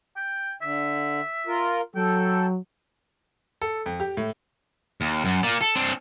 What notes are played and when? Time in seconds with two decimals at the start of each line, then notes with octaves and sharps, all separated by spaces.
0.16 G5
0.62 D3 E5
1.47 F4 A#4
1.95 F#3 A4 G5
3.62 A4
3.86 F2
4.00 G4
4.17 A2
5.01 D#2
5.25 F#2
5.43 A#3 D5
5.61 A4
5.76 C4 D4